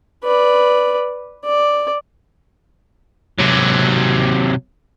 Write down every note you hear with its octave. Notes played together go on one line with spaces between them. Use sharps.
B4 D5
D5
C3 F#3